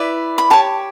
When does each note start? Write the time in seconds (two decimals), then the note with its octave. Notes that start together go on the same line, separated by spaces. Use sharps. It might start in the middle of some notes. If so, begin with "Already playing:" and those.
Already playing: E4 B4 D5
0.38 B5
0.50 G4 C#5 A5